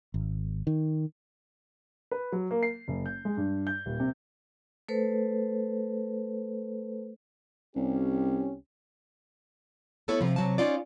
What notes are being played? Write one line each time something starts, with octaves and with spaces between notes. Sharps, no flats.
G#1
D#3
B4
F#3
A#3
C7
F#1
G6
G#3
G2
G6
D#1
C3
A3 A4 B4 C5
C2 C#4 G4
A3 B3 E4 A4 C#5
C3 F3
C3 F#3 A5
C#4 D#4 F4 D5